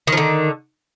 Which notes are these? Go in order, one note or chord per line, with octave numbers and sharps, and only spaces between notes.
D3 D#3 F3